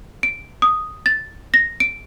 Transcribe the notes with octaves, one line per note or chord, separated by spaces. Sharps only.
D7
D#6
A6
A#6
D7